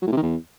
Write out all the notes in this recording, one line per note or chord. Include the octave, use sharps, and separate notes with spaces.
F#3
A2
C3
D#3
E2